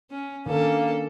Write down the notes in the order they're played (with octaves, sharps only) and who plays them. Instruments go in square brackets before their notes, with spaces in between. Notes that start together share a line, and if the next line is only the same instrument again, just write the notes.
[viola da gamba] C#4
[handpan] D#3 [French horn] A#3 [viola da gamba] C#4 D4 A4